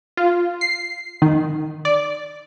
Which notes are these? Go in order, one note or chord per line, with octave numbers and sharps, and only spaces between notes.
F4
C7
D#3
D5